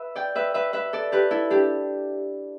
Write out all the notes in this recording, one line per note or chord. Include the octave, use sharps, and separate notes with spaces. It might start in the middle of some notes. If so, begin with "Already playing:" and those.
Already playing: B4 E5
D5 G5
B4 E5
B4 E5
B4 E5
A4 D5
G4 B4
E4 A4
D4 G4